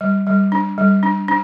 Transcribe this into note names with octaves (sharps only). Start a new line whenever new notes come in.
G3
G3
D4
G3
D4
D4